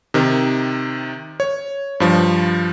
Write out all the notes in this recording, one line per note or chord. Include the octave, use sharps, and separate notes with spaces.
C3 D#3
C#5
G2 F3